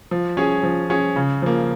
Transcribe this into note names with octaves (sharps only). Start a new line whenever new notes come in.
F3
C#4 G#4
F3
C#4 G#4
C#3
F3 A#3